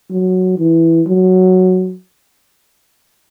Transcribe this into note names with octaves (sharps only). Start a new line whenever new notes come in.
F#3
E3
F#3